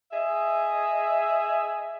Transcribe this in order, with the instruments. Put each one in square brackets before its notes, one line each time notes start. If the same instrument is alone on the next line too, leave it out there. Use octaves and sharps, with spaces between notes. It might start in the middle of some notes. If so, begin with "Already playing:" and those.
[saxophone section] G#4 D#5 E5